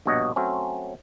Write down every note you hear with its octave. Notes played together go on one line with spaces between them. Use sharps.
A#1 G2 B2 C#5 D#5 F#5
F#3 A3 C4 C#4